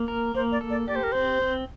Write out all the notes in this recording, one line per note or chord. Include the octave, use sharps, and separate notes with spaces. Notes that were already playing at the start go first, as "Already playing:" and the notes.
Already playing: A#3
A#4
A#3 C5
D5
A4
D5
G4 D5
C5
A#4
C4 C5
C4